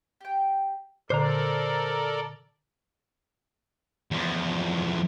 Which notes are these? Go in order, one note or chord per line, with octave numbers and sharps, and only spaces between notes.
G4 G5
A#2 D3 A4 A#4 C5 D5 A#5
E2 F3